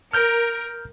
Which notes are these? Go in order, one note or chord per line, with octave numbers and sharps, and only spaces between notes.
A#4 F6 G6